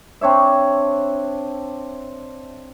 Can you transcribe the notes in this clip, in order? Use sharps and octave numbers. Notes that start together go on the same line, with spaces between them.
C4 D4 C#5 E5